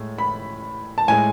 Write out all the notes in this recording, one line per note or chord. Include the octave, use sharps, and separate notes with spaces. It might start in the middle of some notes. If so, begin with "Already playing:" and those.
Already playing: A2 G#3
B5
A5
A2 G#3 G#5